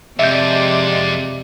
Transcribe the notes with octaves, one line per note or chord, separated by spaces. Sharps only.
F2 C3 G#3 D5 E5 G6